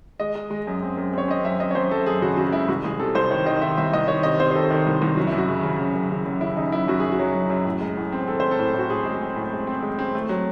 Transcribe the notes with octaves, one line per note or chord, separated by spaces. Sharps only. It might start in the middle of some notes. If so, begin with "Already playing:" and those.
G#3 D#5
G#3
G#3
F#2
C4
F#2
C4 C#5
C4 D#5
F#2 E5
F#2 D#5
C#5
F#2 C5
F#2 A4
F#2 G#4
C#3 F#4
C#3 F#4
G#3 E4
C2 F#4
C2 G#4
C3 A4
C2 C5
D#3 C#5
D#3 D#5
D#3 E5
C2 E5
C2 D#5
D#3 C#5
C3 D#5
C3 C5
C5
D#3 A4
D#3
C2
C2
F#2 F#4
E4
F#2
F#4
C#3
C#3
F#2
F#2
C#3
F#2
C#3 E4
C#3 D#4
F#2 E4
F#2 F#4
F#2 G#4
F#4
F#3
F#2
F#2
A2
G#3
A2
C4
C4 A4
C4 C5
A4
A2
A2 F#4
A2 G#4
G#3
C4
A2
G#3
C4
G#3
C4
A3
F#3